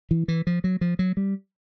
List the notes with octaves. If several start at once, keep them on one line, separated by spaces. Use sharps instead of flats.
E3
E3
F3
F#3
F3
F#3
G3